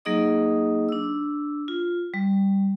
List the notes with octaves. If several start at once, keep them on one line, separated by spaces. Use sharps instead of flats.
F#3 A#3 D#4 G#4 D#5 D#6
D4 E6
F4
G3